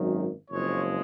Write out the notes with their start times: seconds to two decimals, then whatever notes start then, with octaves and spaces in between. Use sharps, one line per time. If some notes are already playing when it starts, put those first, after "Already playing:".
Already playing: G#1 F#2 D#3 F#3
0.50 F#1 F2 F3 G#3 C#5